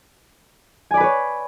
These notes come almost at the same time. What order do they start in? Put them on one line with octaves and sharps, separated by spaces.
G#5 D5 B5 B4 C#5